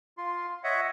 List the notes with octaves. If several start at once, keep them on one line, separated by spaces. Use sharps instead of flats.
F4 C6
C#5 D#5 E5 F#5